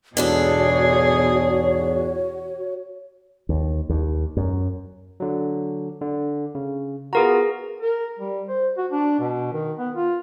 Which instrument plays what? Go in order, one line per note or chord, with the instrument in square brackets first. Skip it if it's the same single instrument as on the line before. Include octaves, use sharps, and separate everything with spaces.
[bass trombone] E2 [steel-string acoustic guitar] G#2 D4 A4 [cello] B2 G#4 [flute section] F#4 C#5
[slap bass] D#2
D#2
F#2
[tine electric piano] D3 F#3
D3
C#3
[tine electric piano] B3 F4 F#4 [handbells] G#4 A#4 A#5
[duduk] A#4
G3
C5
F#4
D4
B2
D#3
B3
F4